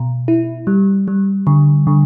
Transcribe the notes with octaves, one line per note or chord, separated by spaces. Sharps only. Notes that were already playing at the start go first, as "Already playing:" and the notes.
Already playing: B2
E4
G3
G3
D3
D3